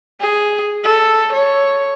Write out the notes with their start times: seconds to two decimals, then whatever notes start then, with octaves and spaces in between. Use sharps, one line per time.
0.21 G#4
0.84 A4
1.33 C#5